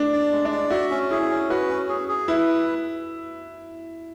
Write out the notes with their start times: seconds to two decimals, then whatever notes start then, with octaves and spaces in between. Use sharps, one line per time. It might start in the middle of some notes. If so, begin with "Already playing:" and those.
Already playing: D4
0.12 D5
0.32 G#3
0.45 D4
0.51 D5
0.70 F#4 E5
0.91 C#4
1.11 E4 G#4
1.30 C#4
1.50 F#4 B4
1.69 C#4
1.89 G#4
2.08 G#4
2.28 E4 B4